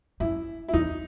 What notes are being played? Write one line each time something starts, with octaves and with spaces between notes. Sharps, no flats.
F#2 E4
E4
E2 D#4